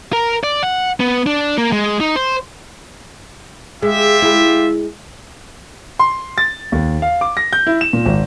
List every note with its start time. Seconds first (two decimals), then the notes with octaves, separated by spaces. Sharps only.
0.13 A#4
0.44 D5
0.63 F#5
1.00 B3
1.27 D4
1.58 A#3
1.72 G#3
2.00 D#4
2.16 C5
3.82 G#3 F4 G4 E5
4.22 G#3 E4
5.99 C6
6.38 A6
6.72 D#2
7.02 F5
7.21 D6
7.37 A#6
7.53 G6
7.67 E4
7.81 E7
7.93 A#2
8.06 G#1